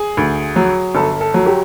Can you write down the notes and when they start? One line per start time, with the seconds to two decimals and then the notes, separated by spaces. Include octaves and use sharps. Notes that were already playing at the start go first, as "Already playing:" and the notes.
Already playing: G#4
0.17 D2
0.56 F#3
0.95 G1 A4
1.21 A4
1.34 F#3
1.46 G4